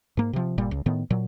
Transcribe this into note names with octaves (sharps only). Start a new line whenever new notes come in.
G#2 A#3
C3 F3
G1 A#2 G3
C#2
A2 D#3 B3
A#2 F#3